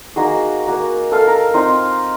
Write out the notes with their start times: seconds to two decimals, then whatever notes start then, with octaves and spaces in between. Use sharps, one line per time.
0.16 A#3 D#4 F#4 G#4
0.67 A#3 F#4
1.11 A4 F5
1.27 A#4
1.54 C4 D#4 F4 F5